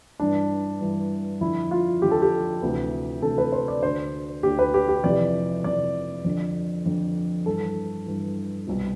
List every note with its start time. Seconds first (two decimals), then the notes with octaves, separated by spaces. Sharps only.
0.20 G2 E3 D4
0.81 G2 E3
1.41 F2 D3 E4
1.71 F4
2.01 F2 D3 G4
2.11 A4
2.22 G4
2.62 D2 C3 E3
3.22 D2 C3 E3 A4
3.38 B4
3.52 C5
3.68 D5
3.83 D2 D3 C5
4.43 D2 D3 G4
4.59 B4
4.74 G4
4.89 G4
5.04 F2 C3 E3 D5
5.64 F2 C3 E3 D5
6.24 F2 D3
6.86 F2 D3
7.46 G2 E3 A4
8.06 G2 E3
8.66 C2 B2